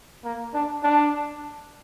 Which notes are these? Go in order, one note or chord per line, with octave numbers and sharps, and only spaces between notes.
A#3
D4
D4